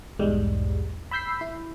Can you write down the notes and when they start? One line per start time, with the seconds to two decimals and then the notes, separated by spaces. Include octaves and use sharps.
0.19 B1 E2 G#2 G3 G#3
1.11 B5 E6 G6 B6 C7
1.41 E4